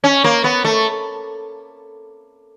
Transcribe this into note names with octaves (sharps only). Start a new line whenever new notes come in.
C#4
A#3
B3
A3